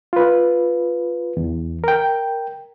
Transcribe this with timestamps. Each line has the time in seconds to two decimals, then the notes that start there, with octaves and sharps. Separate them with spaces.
0.13 F4 B4
1.37 E2
1.84 A#4 G5